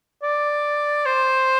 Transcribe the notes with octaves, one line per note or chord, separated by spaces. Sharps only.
D5
C5